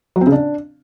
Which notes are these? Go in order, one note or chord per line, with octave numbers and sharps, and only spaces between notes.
F#3
C4
C#3
D4